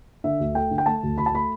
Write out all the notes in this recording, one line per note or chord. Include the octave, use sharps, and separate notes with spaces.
D3 E5
D2
A3 G5
D3
G5
A3 A5
D2
D2 B5
A5
A3 B5